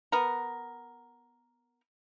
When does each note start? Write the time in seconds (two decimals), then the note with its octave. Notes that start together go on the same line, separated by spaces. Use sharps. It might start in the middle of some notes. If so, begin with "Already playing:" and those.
0.12 B3 A#4